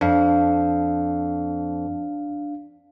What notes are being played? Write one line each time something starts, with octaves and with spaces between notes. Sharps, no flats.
F2 D4 F5